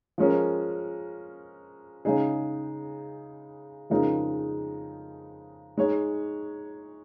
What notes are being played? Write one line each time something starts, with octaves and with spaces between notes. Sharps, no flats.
F3 G#3 C#4 A#4
C#3 G#3 D#4 G#4
F2 C#3 G#3 D#4 A#4
G#3 D#4 C#5